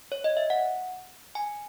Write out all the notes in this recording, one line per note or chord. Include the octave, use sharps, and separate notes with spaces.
C#5
D#5
E5
F#5
G#5